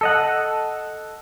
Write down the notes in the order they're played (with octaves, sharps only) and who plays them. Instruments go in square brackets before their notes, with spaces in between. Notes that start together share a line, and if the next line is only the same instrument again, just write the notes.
[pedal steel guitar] A4 D#5 F#5